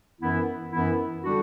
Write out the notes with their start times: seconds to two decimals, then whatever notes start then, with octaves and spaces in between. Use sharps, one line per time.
0.21 F#2 E3 B3 E4
0.72 F#2 E3 B3 E4
1.23 D3 G3 D4 F#4